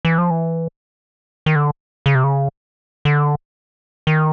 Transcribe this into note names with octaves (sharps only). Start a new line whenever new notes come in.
E3
F3
E3
D#3
D3
C#3
C3
C#3
D3
D#3